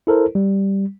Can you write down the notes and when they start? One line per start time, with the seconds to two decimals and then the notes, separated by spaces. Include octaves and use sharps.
0.07 E4 A4 A#4 C5
0.35 G3